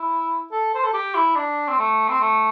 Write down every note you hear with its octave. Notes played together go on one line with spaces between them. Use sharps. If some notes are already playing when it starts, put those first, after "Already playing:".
Already playing: E4
A4
C5
A4
G4
E4
D4
C4
A3
C4
A3